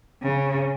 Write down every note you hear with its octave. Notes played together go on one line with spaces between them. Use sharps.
C#3